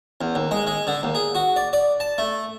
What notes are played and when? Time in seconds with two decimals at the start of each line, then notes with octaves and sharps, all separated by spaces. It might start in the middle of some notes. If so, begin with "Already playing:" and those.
0.21 E2
0.35 D#2
0.51 G#3
0.67 G#3
0.87 D3
1.03 D#2
1.15 G#4
1.35 F#4
1.56 D5
1.73 D5
2.00 A5
2.18 A3